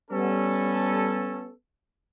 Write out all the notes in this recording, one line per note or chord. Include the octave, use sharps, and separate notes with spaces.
G3 B3 C#4 A4